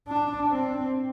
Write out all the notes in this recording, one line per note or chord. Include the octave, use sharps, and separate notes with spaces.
D4
C4